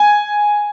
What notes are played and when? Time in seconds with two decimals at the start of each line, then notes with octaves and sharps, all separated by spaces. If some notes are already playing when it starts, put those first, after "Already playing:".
Already playing: G#5